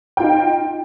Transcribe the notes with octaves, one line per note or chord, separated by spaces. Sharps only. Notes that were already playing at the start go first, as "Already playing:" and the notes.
D#4 F4 G5